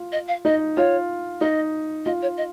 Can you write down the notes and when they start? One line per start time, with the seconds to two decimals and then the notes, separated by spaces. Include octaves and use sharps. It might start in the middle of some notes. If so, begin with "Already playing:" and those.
Already playing: F4
0.12 D#5
0.28 F5
0.45 D#4 D#5
0.77 F4 C#5
1.41 D#4 D#5
2.05 F4 D#5
2.22 C#5
2.37 D#5